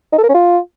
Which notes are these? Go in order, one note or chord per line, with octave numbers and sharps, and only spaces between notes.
D#4
A4
A#4
C#4
F4